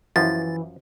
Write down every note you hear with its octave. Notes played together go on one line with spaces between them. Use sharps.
F#2 E3 F3 A6